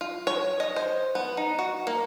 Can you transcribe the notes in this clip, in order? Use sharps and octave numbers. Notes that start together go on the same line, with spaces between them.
F4
C#5
D#5
C5
B3
D#4
F#4
A#3